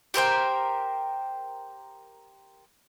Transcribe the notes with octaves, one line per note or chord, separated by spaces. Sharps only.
G4 A#4 C5 G5